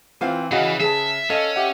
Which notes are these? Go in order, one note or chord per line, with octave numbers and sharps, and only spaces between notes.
E3 C4 F4 C5 F5
C#3 E3 F#4 D#5 F5
G#4 B4 E5 A5
C#4 A4 D#5 F5 E7
G4 E5 F#5